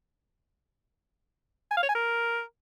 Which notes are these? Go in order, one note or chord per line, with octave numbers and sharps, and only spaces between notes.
G#5
F5
C#5
G#5
A#4